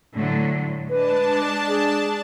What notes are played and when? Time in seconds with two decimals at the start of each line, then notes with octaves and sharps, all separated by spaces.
0.13 A2 D3 F#3
0.90 G#3 D4 B4 A5
1.68 G#4